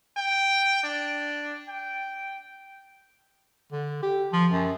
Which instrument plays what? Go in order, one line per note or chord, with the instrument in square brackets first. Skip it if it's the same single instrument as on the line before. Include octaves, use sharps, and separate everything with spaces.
[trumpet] G5
D4
G5
[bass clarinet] D3
G4
F3
F#2